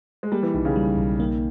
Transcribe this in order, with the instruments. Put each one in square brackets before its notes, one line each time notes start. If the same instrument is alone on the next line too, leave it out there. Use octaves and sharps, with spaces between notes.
[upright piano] G#3
[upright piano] G3 [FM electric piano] A#3
[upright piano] E3
[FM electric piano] B1 [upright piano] D#3
[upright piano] C#3
[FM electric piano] G3
B1
[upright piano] D#3 [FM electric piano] A#3